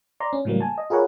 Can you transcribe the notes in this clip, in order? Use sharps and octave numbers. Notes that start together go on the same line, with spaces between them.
D5 A#5 C6
C#4
A2 C#3 E3 F#3 G3 A#3
G#5 A5
D#5
F4 G#4 A#4 B4 C#5 F#5